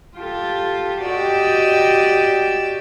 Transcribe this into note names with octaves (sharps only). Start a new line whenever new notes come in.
F4 G4 A4
F#4 G4 D5 D#5 G5 E6